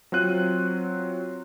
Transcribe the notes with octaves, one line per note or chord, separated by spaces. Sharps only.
F#3 C4 F4 F#6 D#7